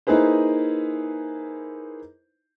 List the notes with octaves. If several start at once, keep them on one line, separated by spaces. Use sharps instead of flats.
A#3 D#4 E4 G#4 B4 C5